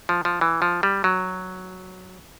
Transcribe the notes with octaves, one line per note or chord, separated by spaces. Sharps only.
F3
F3
E3
F3
G3
F#3